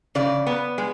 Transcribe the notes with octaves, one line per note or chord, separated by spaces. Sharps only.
C#3 D5
B3
G#3